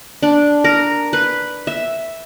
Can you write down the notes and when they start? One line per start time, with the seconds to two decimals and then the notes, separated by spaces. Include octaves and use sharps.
0.23 D4
0.64 A#4
1.13 B4
1.67 E5